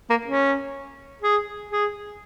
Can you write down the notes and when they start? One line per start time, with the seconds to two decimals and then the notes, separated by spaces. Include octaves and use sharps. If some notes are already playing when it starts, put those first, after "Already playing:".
0.10 A#3
0.25 C#4
1.22 G#4
1.71 G#4